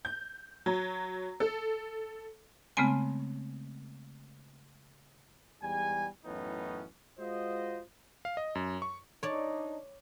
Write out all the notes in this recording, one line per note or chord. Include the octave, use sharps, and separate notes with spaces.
G6
F#3
A4
C#3 G#3 A3 B3 C4 G#5
E2 G#2 G3 G#5
F#2 A2 E3 B3 C#4 D#4
G#3 F4 F#4 C5 D#5
F5
D#5
F#2
C#6
D4 D#4 C#5 D5